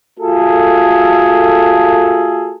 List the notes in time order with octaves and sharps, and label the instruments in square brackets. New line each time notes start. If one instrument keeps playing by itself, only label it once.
[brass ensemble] A3 F4 F#4 G#4 A4